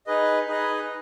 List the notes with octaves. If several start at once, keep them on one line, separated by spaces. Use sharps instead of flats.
D#4 G#4 B4 D#5
D#4 G#4 B4 D#5